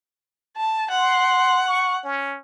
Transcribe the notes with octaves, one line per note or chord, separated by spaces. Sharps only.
A5
F#5 C6
C#6
C#4